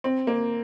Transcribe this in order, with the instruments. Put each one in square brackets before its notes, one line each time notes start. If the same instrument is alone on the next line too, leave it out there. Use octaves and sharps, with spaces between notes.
[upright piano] C4
A#3